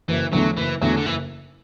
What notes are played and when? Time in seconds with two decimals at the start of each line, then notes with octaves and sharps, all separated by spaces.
0.08 F#1 E3
0.33 E2 D3 F#3 A3
0.57 F#1 E3
0.82 E2 D3 F#3 A3
0.97 D3
1.06 F#1 E3